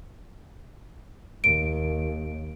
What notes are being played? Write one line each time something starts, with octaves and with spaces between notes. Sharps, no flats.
D#2 D7